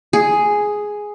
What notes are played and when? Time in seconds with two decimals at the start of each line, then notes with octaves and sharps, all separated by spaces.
0.13 G#4